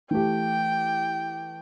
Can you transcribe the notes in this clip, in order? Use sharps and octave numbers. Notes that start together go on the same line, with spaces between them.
E3 A3 G4 G5